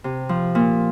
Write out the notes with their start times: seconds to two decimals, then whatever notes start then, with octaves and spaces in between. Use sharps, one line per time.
0.04 C3
0.29 F3
0.55 A#2